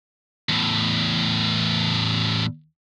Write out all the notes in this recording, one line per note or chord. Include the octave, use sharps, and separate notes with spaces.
E2 A2